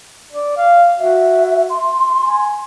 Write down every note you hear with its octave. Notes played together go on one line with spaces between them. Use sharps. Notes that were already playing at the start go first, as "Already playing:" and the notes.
D5
F5
F#4 E5
C6
G#5